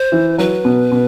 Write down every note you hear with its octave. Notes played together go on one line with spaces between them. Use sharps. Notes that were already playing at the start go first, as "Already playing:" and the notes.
Already playing: C5
E3
F#3 B4
B2
B2